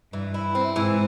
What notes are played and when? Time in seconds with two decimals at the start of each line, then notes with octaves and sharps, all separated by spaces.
0.13 G2 E3
0.34 E4
0.55 C4
0.76 G#2 E3